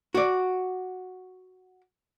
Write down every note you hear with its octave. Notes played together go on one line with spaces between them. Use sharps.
F#4 D5